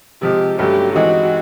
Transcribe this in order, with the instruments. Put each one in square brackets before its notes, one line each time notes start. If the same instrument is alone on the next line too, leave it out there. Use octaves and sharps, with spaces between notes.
[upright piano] C3 F3 G#3 [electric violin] G4
[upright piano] G2 D3 F#3 A3 C#4 [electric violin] G4
[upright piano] E3 G#3 C4 D#4 [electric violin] F#4